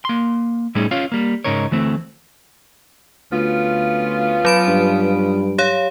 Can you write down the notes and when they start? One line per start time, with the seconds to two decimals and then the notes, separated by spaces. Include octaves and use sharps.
0.05 A#3 C6
0.75 A2 G3 A3 C#4 D#4 G#4
0.91 C#4 F4 C#5 F5
1.12 G3 A#3
1.44 G#2 C#3 D#4 A#4 C#5
1.71 D2 E3 A3 C4
3.32 D2 B3 C#4 F4
4.45 F#3 B5 D7
4.68 G2
5.58 G4 C#5 F5